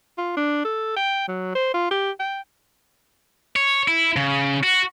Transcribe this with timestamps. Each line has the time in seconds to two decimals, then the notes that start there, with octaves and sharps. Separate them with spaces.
0.18 F4
0.37 D4
0.65 A4
0.96 G5
1.28 F#3
1.55 C5
1.74 F4
1.91 G4
2.20 G5
3.56 C#5
3.88 E4
4.16 C#3
4.63 F#4